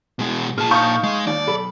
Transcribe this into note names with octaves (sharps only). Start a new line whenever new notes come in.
B2 G#3
A#2 F4 G#4 A5 F6
D#4 C#5 F5 C#6 D#6 G6
G#3
D#2 D5
B1 A4 B5